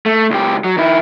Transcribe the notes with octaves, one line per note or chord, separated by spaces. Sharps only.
A3
C#2 G4
F#3
D#3 E4